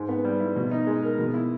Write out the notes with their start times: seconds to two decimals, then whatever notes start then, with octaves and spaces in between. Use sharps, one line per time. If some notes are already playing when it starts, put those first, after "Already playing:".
Already playing: G#2
0.09 B3
0.24 G3
0.40 E4
0.56 B2
0.71 D#4
0.87 G#3
1.03 A#4
1.18 B2
1.34 E4